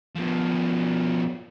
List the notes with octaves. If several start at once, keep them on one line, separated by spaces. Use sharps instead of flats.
B2 F3